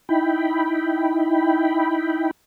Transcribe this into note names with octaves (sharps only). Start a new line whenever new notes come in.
D#4 E4 G5 B5